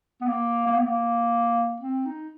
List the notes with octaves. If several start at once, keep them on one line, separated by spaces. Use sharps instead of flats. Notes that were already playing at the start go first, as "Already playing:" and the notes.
B3
A#3
A#3
B3
A#3
C4
D#4